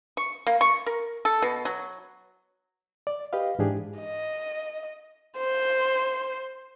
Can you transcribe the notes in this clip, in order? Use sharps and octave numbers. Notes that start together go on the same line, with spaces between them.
C#6
A#3
C#6
A#4
A4
B2
F#3
D5
G4 B4 D#5 F5
G#2 E3 D4 G4 G#4
D#5
C5